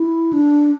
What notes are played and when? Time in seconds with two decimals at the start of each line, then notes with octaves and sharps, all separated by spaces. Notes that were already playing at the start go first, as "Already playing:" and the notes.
Already playing: E4
0.33 D4